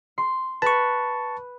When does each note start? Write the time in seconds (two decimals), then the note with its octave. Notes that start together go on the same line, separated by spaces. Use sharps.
0.18 C6
0.62 B4 A5 C#6